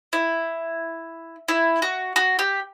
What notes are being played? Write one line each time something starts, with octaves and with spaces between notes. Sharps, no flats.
E4
E4
F#4
F#4
G4